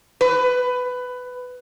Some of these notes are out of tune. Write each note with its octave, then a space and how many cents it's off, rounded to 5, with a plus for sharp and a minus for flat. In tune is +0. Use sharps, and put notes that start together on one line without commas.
B4 +15